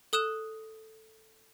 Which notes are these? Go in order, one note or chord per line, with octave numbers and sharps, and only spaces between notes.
A4 D#6 F#6 E7